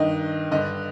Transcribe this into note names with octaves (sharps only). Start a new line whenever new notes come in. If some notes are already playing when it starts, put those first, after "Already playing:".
Already playing: G2 D#3 D#5
G2 D3 D#5